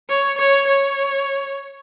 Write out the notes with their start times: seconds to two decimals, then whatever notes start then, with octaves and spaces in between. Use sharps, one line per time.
0.09 C#5
0.38 C#5
0.68 C#5